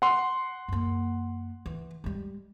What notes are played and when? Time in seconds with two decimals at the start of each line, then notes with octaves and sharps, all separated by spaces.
0.02 F#5 C6
0.68 F#2 A#3
1.66 E3
2.04 G3 G#3